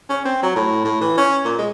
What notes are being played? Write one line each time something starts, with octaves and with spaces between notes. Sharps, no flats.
C#4
C4
F#3
A2
A2
E3
C#4
A#2
G#3